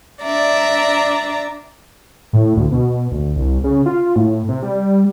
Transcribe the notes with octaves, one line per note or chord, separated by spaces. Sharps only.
D4 D5 E5 A#5
A2
D2
B2
D2
C2
C#3
F4
A2
C3
G3